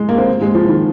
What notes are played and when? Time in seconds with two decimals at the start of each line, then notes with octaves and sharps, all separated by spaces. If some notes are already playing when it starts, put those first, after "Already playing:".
Already playing: G#3
0.09 A#3
0.18 C4
0.41 G#3
0.54 F3
0.68 D#3